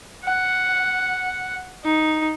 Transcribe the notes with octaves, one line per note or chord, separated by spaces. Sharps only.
F#5
D#4